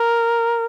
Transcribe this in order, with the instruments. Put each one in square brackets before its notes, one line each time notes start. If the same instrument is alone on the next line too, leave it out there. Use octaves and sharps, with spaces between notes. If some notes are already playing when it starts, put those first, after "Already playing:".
Already playing: [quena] A#4